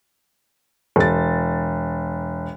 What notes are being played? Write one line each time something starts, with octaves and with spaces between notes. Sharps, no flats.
E1 A6